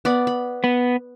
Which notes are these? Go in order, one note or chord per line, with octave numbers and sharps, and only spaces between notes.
B3 D5 B5
B5
B3